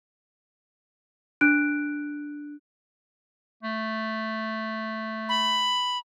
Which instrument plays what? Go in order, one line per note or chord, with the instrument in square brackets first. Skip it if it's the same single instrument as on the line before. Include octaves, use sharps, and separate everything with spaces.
[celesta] D4 F#6 D7
[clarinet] A3
[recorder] B5